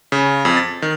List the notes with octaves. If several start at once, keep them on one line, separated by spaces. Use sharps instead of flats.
C#3
F2
A6
D#3